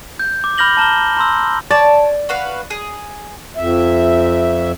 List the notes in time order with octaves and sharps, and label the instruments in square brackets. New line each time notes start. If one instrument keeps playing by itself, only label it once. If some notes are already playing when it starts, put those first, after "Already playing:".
[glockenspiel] G6
D6
B5 F6 G6 A#6 F#7 G7
A5 A#5 F6 G7
A#5 C6 E6
[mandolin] C#5 A5 [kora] D5
[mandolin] F#4 B4 F5
G#4
[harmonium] F2 E5